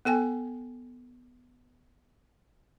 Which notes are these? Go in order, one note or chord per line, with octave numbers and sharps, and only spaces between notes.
B3 A4 G5 G#5